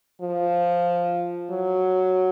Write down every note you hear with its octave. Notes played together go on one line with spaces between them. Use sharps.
F3
F#3